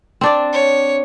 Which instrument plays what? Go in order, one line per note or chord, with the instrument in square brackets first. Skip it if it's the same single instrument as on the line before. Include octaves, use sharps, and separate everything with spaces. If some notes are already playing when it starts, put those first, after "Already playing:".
[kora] C4 D4 D5
[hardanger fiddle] C#5